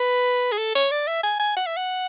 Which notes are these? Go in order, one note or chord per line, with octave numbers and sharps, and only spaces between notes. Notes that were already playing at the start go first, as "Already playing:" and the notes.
Already playing: B4
G#4
A4
C#5
D5
E5
G#5
G#5
F#5
E5
F#5